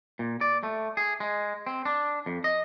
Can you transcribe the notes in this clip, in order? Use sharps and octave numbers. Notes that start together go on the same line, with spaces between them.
A#2
D5
A3
G#4
G#3
C4
D4
F2
D#5